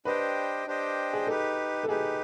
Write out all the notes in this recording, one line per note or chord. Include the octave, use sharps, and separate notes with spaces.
D4 G4 B4 C5 D#5 G5
D4 G4 C5 D#5 G5
G#4
D#4 G4 A4 B4
A4
D#4 G4 G#4 B4